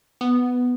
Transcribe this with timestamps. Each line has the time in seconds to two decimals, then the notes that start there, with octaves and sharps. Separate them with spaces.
0.21 B3